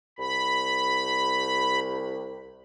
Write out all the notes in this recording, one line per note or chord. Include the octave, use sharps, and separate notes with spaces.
C2 B5